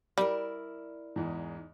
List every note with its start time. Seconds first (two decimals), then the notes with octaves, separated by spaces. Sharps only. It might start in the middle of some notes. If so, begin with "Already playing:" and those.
0.18 G3 E4 A#4 D5
1.16 E2 G#2